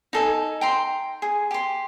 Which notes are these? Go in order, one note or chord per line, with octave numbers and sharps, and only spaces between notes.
D#4 A4 G#5
G5 A#5 C6
G#4
G4 C6